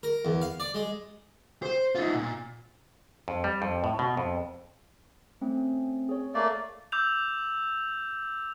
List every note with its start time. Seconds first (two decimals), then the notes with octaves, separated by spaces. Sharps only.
0.03 A#4
0.25 E2
0.42 F5
0.60 D5
0.74 G#3
1.63 C5
1.95 D#4 F4
2.14 A#2
3.28 F2
3.44 G3
3.62 F2
3.84 A2
3.99 B2
4.17 F2
5.41 A3 C4 C#4
6.09 G#4 C#5
6.35 A3 A#3 D5
6.92 D6 E6 G6 F7